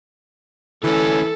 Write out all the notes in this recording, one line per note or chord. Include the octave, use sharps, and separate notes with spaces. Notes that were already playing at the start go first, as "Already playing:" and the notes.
D2 E3 C#4 A4